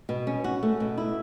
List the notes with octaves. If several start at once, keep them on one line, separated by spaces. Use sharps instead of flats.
B2
C#4
F#4
A3
B2
E4